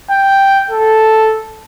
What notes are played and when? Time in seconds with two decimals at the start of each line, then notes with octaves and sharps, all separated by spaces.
0.10 G5
0.71 A4